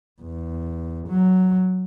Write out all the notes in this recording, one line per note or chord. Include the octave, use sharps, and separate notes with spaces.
E2
F#3